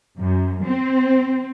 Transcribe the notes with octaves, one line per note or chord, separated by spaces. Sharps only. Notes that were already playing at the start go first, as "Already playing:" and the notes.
F#2
C4